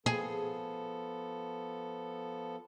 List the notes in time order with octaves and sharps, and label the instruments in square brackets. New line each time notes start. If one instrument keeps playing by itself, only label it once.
[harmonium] F3 B3 A4 [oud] G#4